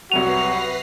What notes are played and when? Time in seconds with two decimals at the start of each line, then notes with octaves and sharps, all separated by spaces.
0.12 C2 F#3 F#4 B4 A#6 C7 D#7 F7